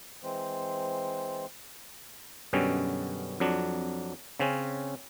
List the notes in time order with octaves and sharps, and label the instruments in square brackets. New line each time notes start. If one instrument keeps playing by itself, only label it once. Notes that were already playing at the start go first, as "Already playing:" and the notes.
[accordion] E3 G#3 C4 C5
[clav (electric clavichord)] F#2 B2 D3 G3 C#4
F2 F#3 D4
C#3 C4 C#4